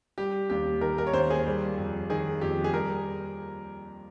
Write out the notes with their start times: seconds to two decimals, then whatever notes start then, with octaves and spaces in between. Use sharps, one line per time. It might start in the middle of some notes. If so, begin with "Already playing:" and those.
0.18 G3 G4
0.50 D#2 G4
0.81 D#3 A#4
0.98 A#4
1.07 C#5
1.13 D#2 C5
1.30 G#4
1.46 G3
1.77 F2
2.09 D#3 G#4
2.41 F2 G4
2.64 G#4
2.73 G3 A#4